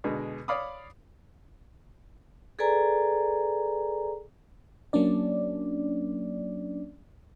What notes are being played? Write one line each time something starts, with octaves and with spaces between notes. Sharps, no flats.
B2 D3 G#3
C#5 D5 F5 B5 D6 D#6
G#4 A4 B4 D5 G#5 A#5
F#3 A#3 C#4 D4 D5